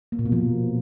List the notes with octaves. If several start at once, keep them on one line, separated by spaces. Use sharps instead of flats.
A#3
A#2
B2
F3